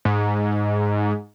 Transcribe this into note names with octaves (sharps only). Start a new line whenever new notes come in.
G#2